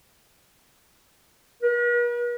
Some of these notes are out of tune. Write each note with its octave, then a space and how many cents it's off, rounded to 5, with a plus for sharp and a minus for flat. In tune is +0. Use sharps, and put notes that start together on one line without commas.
B4 -45